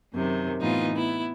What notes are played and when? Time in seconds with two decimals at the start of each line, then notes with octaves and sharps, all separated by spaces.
0.13 F#2 C3 D#3
0.60 A2 E3 B3 D#4 F4
0.94 B3 E4